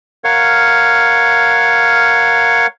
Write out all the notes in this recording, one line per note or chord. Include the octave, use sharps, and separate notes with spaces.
A#4 C#5 F5 F#5